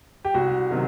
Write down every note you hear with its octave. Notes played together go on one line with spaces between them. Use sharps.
G4
C2 F#4
C3 D#3 F#3